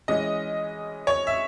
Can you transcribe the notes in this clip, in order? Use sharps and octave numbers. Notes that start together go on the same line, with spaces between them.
E3 G#3 C#4 D#5
C#5
E5